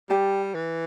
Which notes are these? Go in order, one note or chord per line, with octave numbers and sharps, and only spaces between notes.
G3 G4 D5 A5
E3